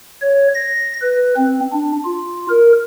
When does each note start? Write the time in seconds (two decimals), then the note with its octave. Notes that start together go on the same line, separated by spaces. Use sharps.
0.22 C#5
0.54 A#6
1.01 B4
1.36 C4
1.73 D4
2.05 F4
2.49 A#4